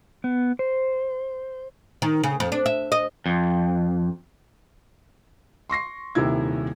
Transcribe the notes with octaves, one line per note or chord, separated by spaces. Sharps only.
B3
C5
D#3
C#3
F2
D4
E5
D#5
F2
C6 C#6 A#6 C7
D#1 C3 D#3 E4 G#6